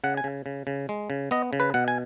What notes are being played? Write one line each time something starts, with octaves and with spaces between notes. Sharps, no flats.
C#3 F#5
G#5
C#3
C#3
C#3
G#3
C#3
B3 D#5
C#3
B4
B2 F#5
G#5